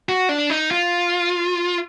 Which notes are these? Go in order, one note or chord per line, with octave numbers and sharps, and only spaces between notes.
F#4
D4
D#4
F4